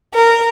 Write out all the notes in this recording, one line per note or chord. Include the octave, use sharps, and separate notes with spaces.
A#4